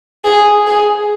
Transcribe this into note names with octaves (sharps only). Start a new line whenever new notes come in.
G#4
G#4